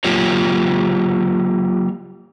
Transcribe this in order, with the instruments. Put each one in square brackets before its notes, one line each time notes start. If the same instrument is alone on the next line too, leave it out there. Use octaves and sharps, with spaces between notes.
[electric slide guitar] F#3 A#3 F4 G4 A#4 C#5